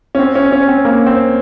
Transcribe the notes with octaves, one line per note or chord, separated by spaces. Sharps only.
C#4
C4
C#4
C#4
C4
A#3
C4